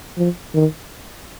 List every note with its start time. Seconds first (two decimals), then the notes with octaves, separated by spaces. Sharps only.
0.17 F3
0.54 D#3